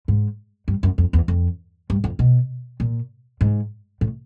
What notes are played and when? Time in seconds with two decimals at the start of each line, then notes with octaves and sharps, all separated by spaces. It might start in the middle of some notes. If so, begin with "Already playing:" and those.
0.08 G#2
0.68 G2
0.83 F#2
0.98 F2
1.13 E2
1.28 F2
1.90 G2
2.04 F2
2.19 B2
2.80 A#2
3.41 G#2
4.01 A2